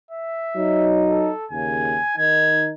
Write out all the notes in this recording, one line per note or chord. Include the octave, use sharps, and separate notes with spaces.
E5
F#3 D#4
A4
D#2 C#3 G#5
D#3 D#4 G#6